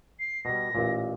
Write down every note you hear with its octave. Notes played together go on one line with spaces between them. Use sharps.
C7
B2 G3 A#6
A1 A#2